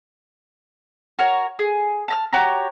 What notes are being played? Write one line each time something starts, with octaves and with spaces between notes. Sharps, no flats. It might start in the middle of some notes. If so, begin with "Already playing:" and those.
F#4 A#4 C#5
G#4
A5 A#5 F6
F#4 G4 C#5 A#5